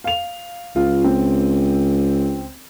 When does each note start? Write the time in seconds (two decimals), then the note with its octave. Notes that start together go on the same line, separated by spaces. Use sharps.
0.04 F5 F7
0.76 C#2 F4
1.04 C4